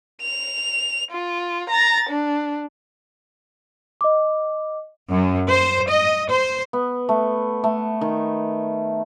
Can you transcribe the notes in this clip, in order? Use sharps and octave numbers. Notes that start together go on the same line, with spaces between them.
F7
F4
A#5 A6
D4
D#5 D6
F#2
C5
D#5
C5
B3
A3
A3
D#3